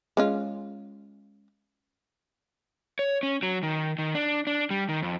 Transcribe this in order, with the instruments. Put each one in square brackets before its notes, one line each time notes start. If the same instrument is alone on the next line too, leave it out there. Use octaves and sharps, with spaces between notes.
[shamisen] G#3 C#4 F4
[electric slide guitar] C#5
C#4
F#3
D#3
D#3
D4
D4
G3
D#3
F2